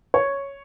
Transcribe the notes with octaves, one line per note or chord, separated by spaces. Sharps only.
C#5